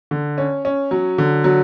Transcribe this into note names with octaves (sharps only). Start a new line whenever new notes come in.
D3
C#4
C#4
F#3
D3
F#3